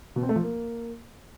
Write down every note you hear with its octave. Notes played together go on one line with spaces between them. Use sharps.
B2
C4
A3
F3
A#3